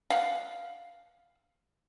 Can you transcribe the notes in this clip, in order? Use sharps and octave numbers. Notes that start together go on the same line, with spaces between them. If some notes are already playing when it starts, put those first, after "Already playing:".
F5 F#5